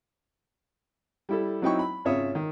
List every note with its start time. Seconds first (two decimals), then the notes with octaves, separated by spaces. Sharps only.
1.29 G3 E4 A4
1.62 F#3 C4 D#4 E4 G5 C#6
1.79 B5
2.05 G#1 C#3 F4 C#5 E5 D#6
2.35 D#3